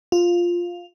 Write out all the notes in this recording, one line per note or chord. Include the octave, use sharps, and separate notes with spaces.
F4